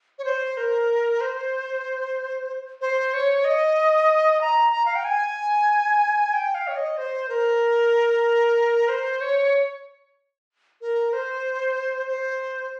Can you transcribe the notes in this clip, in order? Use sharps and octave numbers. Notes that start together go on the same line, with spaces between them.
C#5
C5
A#4
C5
C5
C#5
D#5
A#5
A#5
F5
G5
G#5
G5
F5
C#5
D#5
C5
A#4
C5
C#5
A#4
C5
C5